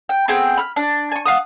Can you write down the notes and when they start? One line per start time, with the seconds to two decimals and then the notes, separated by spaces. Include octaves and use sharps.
0.09 G5
0.28 B3 C4 G#4 G5
0.58 B5 F6
0.76 D4
1.11 G#5 C#6
1.26 F5 F#5 D#6